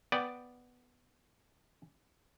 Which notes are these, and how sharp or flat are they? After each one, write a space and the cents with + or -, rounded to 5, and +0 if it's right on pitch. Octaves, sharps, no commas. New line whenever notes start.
B3 +0 D5 +0 G5 +0